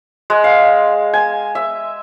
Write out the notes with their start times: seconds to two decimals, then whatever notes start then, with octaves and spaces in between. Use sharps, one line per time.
0.30 G#3
0.44 F5
1.14 G#5
1.55 E5